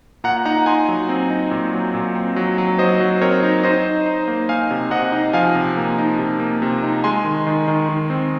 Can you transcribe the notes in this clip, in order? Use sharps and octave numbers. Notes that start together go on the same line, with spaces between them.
A#2 F#5 A#5
D#4 F#5 A#5
D#4 G#5 C6
F#3
C4
D#4
A#2
F#3
A#2
C4
F#3
F#3
F#3 C5 D#5
F#3
C4 A#4 C#5
D#4
D#4 C5 D#5
D#4
D#4
A#3
D#4 F5 G#5
C3
C3 D#5 F#5
D#4
F3 F5 G#5
C3
A#3
D#4
C3
A#3
C3
D#4
G#3 G#5 C6
D#3
D#3
D#3
D#3
C4